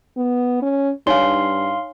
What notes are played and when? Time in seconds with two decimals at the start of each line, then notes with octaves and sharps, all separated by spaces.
0.17 B3
0.62 C#4
1.07 G2 D#4 C#5 F5 G#5 C6